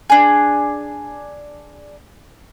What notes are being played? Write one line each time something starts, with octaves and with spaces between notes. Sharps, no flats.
D4 G#4